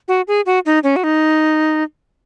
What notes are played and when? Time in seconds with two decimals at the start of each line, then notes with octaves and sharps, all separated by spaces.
0.08 F#4
0.28 G#4
0.46 F#4
0.66 D#4
0.84 C#4
0.96 F#4
1.04 D#4